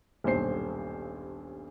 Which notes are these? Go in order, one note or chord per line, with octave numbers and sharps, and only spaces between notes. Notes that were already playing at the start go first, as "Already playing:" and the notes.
D#1 B1 G2 C5 C7